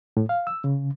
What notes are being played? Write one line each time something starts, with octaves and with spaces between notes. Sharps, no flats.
A2
F5
E6
C#3